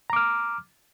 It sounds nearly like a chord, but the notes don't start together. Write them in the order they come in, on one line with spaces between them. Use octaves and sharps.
A#5 D6 F6